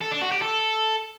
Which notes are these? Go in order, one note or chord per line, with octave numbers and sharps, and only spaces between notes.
A4
D4
F#4
G4
A4